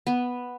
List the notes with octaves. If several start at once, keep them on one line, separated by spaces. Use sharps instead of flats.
B3